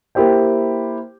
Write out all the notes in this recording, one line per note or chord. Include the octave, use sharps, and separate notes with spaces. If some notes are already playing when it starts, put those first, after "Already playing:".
A#3 E4 G4 C5 G5